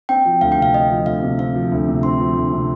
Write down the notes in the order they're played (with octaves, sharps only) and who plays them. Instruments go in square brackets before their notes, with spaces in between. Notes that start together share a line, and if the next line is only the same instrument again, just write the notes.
[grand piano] C4 [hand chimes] G5
[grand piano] F3
[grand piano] D2 [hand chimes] F5
[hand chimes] G5
[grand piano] C3 [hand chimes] F5
[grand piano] C4 [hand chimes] D#5
[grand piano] F3
[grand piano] D2 [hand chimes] F5
[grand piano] C3
[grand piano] C4 [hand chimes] F5
[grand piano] F3
D2
C3
[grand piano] C4 [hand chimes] C6
[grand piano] F3
D2
C3